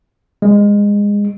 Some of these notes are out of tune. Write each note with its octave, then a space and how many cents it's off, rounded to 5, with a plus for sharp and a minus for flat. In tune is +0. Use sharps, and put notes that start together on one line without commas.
G#3 -20